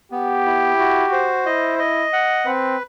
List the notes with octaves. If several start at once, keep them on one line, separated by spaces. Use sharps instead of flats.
B3 G4
E4
F#4
C5
E4 D#5
D#5
F#5
C4 B4